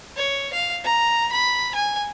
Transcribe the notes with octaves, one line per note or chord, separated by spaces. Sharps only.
C#5
F5
A#5
B5
G#5